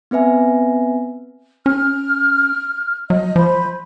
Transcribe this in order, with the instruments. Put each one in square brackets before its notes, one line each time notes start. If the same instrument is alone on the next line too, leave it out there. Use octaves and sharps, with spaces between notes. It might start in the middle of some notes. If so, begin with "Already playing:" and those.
[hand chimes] B3 C4 B4 E5 G#5
[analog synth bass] C#4 [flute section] F6
[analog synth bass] F#3 [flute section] D#5
[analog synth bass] F3 [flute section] C5 B5